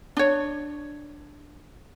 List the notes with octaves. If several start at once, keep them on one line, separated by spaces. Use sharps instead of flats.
D4 C#5